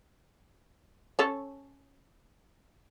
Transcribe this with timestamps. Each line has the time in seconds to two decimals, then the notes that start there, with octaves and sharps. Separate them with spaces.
1.19 C#4 A4 C#5